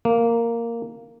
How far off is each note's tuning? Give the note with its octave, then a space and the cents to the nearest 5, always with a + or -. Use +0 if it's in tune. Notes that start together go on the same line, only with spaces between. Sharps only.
A#3 -5